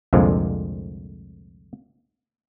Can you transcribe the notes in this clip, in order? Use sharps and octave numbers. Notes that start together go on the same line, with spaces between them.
C2 F2 A#2 D3 F3 G#3